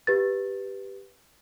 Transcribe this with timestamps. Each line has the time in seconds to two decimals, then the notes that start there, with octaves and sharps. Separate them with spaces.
0.07 G4 B4 A6